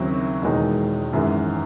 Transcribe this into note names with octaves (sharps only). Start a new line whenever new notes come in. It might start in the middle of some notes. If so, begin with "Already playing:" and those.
Already playing: D#2 C#3 F#3 C4 E4
E1 E2 D#3 G#3 D#4
G#1 F#2 E3 G#3